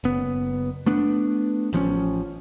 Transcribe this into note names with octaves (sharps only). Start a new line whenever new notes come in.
F#1 B3
A3 B3 D4
A1 F3 B3 C#4